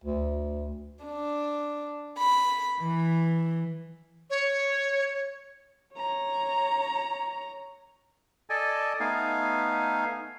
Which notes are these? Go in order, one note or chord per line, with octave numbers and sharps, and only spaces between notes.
D2
D4
B5
E3
C#5
C#5 A#5
A4 D5 D#5 G#5
A3 B3 D#4 F5 G#5